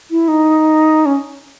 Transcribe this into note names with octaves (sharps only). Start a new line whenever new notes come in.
E4
D#4
C#4